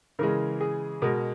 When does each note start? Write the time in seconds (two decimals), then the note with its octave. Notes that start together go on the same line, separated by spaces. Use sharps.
0.19 C#3 E3 G#3 A#4
0.61 G#4
1.02 B2 G#3 A#4